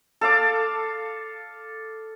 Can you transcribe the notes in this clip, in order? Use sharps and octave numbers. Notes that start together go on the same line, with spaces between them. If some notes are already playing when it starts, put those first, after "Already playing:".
A4 F5 D6